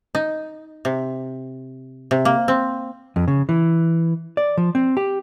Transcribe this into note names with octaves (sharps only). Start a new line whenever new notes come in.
D#4
C3
C3
A#3
C4
F2
C#3
E3
D5
F3
C4
G4